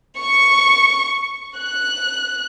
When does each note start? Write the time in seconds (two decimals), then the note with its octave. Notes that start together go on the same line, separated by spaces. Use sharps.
0.19 C#6
1.58 F#6